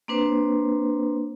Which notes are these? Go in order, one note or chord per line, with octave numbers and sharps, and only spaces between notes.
A#3 C4 D4 B4 C5